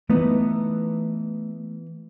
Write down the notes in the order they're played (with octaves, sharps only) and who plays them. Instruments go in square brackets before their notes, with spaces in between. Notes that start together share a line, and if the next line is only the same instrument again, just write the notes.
[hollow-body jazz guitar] E3 B3 D#4 [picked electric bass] A3